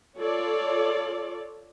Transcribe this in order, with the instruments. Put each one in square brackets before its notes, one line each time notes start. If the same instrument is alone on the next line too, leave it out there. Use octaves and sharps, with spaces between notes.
[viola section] F4 A4 C#5 D5